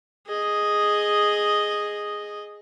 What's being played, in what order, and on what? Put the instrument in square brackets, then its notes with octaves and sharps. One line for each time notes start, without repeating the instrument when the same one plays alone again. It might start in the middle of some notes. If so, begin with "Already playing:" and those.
[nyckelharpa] G#4 D#5